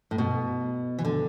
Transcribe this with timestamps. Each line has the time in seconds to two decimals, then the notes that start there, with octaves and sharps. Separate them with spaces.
0.11 A2
0.18 B2
0.99 E3
1.05 D3